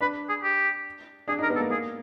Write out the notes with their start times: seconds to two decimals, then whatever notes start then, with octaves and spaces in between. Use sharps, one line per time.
0.01 D4 B4
0.29 G#4
0.43 G4
1.28 D4 G#4
1.38 D#4 A#4
1.50 B3
1.56 A4
1.60 A#3
1.70 A#3 G#4